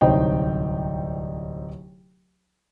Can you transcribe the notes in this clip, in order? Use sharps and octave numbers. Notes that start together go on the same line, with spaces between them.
D1 C2 D#4 C5 C#5 G5